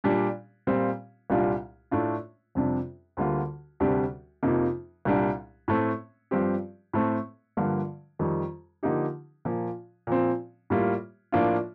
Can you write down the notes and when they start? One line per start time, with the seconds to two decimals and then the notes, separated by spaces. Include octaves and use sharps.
0.04 A#2 G3 D4 G4
0.67 A#2 G3 C4 F4
1.30 C2 A#2 G3 D4 F4
1.91 A2 A3 D4 F4
2.55 F2 C3 G3 D4
3.17 D2 D3 G3 A#3 F4
3.80 D2 C3 G3 D4 G4
4.43 F2 C3 F3 A#3 D#4
5.05 C2 A#2 G3 D4
5.68 A2 A3 C4
6.31 G2 F3 C4 G4
6.93 A2 A3 C4
7.57 G2 D3 F3 A#3
8.19 F2 D#3 G3
8.83 D3 F3 A#3 D#4 G4
9.45 A#2 F3 A#3
10.07 A#2 F3 C4
10.70 A2 G3 A#3 F4
11.32 A2 F3 A#3 D4 F4